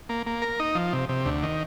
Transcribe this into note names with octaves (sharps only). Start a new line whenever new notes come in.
A#3
A#3
A#4
D#4
F3
C3
C3
D2
D#3